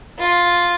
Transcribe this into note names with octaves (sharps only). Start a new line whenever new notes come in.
F4